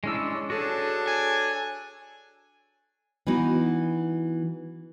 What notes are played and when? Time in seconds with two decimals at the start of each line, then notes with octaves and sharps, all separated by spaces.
0.04 G#3 C#4 D4 E4 E6
0.50 D4 F#4 G#4 A4 C#5
1.08 G#5
3.27 E3 B3 D#4 F#4